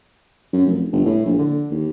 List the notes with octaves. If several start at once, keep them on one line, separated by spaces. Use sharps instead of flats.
F#2
F1
G1
A2
A#1
D3
D#2